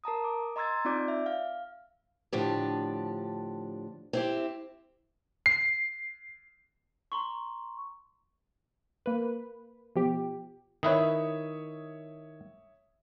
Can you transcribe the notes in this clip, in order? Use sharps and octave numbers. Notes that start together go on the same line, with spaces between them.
A#4 A5 A#5 D#6
D6
D#5 A#5 C6 E6 G#6 A6
C4 D#4 F4 D5 D6 G6
E5
F5
A2 D3 F3 D4 G4
C4 E4 G4
C7
A#5 C6 C#6
A#3 B4
B2 F3 G4
D#3 E4 B4 C#5 E5 D#6